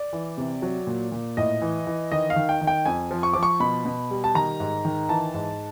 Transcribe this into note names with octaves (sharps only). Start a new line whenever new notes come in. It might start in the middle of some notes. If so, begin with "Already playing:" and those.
Already playing: D5
E3
C3
F#3
A#2
A#2
A2 D#5
E3
E3
D#3 D#5
F5
D#3
G5
D#3
G5
F2 G#5
F3
C#6
F3 D6
C#6
B2 B5
B2
G3
A5
D#3 A#5
G#2
D#3
E3 A5
G#2